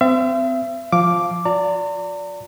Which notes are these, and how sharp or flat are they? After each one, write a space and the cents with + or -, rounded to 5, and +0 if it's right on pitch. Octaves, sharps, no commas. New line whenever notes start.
C4 -30 E5 +40
F3 +0 F5 +0 D6 +0
F4 +35 D5 -20 A#5 -40